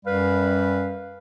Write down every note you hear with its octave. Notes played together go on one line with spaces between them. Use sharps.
F#2 G3 B4 F5